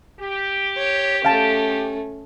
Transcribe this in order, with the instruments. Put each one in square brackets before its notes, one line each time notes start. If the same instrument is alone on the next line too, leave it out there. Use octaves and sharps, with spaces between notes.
[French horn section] G4
[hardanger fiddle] C#5
[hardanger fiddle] A3 C#4 [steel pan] F5 G5 A5